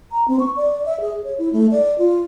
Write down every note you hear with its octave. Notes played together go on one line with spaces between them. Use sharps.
A#5
C4
C#6
D5
E5
G#4
C#5
E4
A3
D5
F4